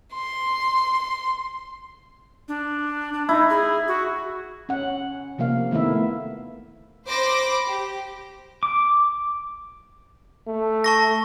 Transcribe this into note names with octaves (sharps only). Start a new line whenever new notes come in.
C6
D4
D4
D#4 E4
G#4
F#4
C#4 F#5
C3 F3 A#3 F5
D#3 A3 B3 E4 E5
C5 B5 D6 A#6
G4
D6
A3
A5 C#6 A#6